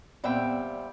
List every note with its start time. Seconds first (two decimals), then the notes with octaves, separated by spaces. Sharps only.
0.24 A#2 G3 B3 C4 E5 G5